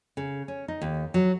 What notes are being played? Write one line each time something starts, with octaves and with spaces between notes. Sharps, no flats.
C#3
C#4
D#4
D#2
F#3